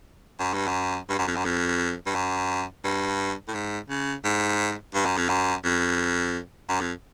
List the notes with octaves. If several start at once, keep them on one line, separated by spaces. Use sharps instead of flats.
F#2
G2
F#2
G2
F#2
F2
F#2
F2
G2
F#2
G2
A2
G#2
C#3
G#2
G2
F#2
F2
F#2
F2
F#2
F2